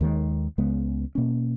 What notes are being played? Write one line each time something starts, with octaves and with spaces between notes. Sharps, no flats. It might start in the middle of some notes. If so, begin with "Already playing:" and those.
D#2 D#3 G#3
C#2 C#3 G#3 B3
B2 A#3 C#4